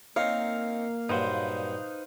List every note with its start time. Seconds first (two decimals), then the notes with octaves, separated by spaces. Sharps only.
0.16 A#3 C4 D#4 C#5 F5
1.09 G2 A#2 F#3 D#4 B4 C5